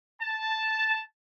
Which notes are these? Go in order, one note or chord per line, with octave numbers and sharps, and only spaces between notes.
A5